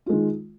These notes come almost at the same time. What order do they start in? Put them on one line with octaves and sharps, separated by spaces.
F4 G#3 D#3